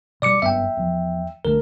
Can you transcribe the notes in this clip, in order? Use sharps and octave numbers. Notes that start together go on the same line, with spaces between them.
B2 G3 D5 D6 C#7
F#1 G2 B3 E5 G5
E2 F3
C2 D3 A3 A#4